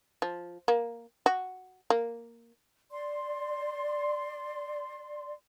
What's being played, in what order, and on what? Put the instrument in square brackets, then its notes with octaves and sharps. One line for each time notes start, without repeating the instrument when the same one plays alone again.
[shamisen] F3
A#3
F#4
A#3
[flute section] D5 C6